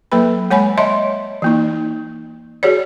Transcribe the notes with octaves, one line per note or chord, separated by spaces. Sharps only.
F#3 A#3 A4 B4 B5
G#3 C#5 G#5 B5
C#5 D#5 E5 A5 C6
E3 A#3 D#4
F#4 G#4 C#5 D5